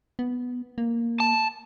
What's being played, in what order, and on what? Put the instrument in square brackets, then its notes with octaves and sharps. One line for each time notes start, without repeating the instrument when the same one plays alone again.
[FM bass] B3
A#3
[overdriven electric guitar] A5